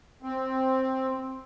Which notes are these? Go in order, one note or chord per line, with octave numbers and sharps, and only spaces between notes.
C4